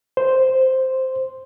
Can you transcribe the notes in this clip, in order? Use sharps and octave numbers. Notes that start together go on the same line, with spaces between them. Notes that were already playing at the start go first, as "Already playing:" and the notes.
C5